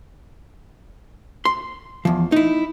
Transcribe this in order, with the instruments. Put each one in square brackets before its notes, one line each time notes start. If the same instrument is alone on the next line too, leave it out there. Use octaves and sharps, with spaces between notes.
[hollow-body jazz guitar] C6
E2 F3
D#4 E4